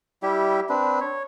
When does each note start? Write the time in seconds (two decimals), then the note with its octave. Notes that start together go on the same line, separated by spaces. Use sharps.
0.23 G3 E4 G4 E5
0.69 C4 D4 B4
1.01 C#5